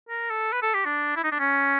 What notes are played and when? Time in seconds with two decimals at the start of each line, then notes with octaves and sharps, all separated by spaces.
0.09 A#4
0.30 A4
0.52 B4
0.62 A4
0.74 G4
0.85 D4
1.16 E4
1.24 D#4
1.32 D4
1.39 C#4